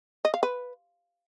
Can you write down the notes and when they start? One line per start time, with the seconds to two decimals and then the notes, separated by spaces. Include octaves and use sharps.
0.25 D#5
0.34 F5
0.43 B4